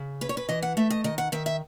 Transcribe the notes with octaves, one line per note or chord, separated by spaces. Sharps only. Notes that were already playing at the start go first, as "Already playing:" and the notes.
Already playing: C#3
C#4 B4
C#5
B4
E3 D#5
F#5
A3 E5
D#5
D#3 D#5
F#5
D#3 E5
E5